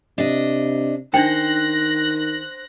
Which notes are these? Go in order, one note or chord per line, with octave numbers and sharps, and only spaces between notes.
C3 D4 D#5
D#3 D4 D#4 C5 G5 F#6 A#6